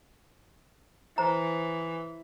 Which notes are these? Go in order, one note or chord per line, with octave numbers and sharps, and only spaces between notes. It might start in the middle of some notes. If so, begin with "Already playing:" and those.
E3 C5 A#5